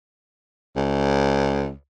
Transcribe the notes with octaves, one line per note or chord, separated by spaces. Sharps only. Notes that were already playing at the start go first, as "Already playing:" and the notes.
C#2